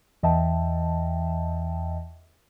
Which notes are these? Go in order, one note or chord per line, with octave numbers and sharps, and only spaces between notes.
E2 E3 D#5 E5 G5 A5